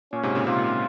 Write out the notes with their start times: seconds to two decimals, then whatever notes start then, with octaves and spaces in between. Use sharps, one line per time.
0.13 A#2 C#4
0.23 G#2 C3
0.35 A#2 C#3
0.47 G#2 C3 F4
0.58 A#2
0.69 C3